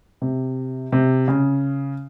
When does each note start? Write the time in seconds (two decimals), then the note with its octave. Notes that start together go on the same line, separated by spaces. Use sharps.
0.22 C3
0.92 C3
1.28 C#3